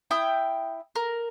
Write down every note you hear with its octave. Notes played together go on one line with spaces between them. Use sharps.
E4 G5 D#6
A#4